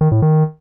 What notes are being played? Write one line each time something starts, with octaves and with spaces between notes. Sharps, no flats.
D#3
A2
D#3